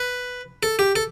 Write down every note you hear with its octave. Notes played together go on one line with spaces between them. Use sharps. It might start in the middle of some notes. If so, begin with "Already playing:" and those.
Already playing: B4
A4
G4
A4